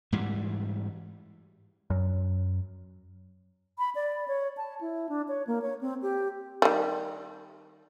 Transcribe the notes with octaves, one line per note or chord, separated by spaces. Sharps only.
G#2 E3 G3
F#2
B5
D5
C#5
A5
E4
D4
C#5
A#3
C#5
C4
G4
D#3 G3